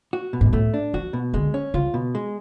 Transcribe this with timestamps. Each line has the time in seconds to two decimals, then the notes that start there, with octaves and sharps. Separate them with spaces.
0.13 F#4
0.33 B2
0.41 G#2
0.53 A2 A3
0.74 D4
0.94 F3 F#4
1.13 B2
1.34 D3 G#3
1.54 C#4
1.74 C#3 F4
1.94 B2
2.15 G#3